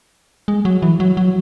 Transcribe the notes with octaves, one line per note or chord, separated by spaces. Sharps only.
G#3
F#3
E3
F#3
F#3